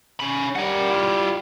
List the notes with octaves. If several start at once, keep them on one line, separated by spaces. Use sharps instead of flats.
C#4 B5
G3 A#4 F#5
E4 F4